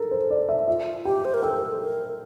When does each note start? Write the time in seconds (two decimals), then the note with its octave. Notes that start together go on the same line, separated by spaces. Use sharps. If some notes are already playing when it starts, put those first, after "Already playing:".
Already playing: A4 A#4
0.11 C5
0.31 D5
0.49 E5
0.68 F4 E5
1.05 G4 G5
1.25 C5
1.34 A#4
1.43 A4 G5
1.81 A#4